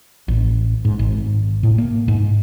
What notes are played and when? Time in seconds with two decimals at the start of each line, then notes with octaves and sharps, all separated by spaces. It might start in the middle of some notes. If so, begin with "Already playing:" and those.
0.28 A1
0.85 G#2
0.99 G#1
1.63 A2
1.78 A#3
2.08 G#2